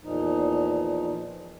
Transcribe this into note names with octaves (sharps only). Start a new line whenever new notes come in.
E2 A#2 F3 D#4